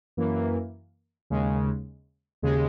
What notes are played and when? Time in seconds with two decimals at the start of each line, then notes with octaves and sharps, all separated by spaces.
0.17 F#2 E3 A#3
1.30 D#2 C#3 G#3
2.43 D#2 C#3 G#3